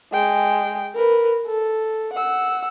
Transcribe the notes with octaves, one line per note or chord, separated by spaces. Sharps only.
G#3 G5
A#4 B4
A4
F#5 E6